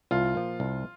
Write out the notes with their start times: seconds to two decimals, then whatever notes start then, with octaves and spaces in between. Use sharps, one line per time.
0.11 C2 F4
0.35 A#2 F3
0.60 C2